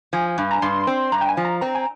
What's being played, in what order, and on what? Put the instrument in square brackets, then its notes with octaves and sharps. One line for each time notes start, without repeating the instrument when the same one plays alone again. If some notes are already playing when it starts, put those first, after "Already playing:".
[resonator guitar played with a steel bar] F3 [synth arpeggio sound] G#5
[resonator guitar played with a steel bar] G2
[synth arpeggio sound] A#5
[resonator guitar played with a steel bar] G2 [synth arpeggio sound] C6
[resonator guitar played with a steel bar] C4
[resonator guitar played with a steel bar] G2 [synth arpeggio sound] A#5
[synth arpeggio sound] G5
G#5
[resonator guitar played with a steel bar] F3
[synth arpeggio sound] A#5
[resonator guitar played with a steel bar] C4 [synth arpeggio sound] A#5
[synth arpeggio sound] G#5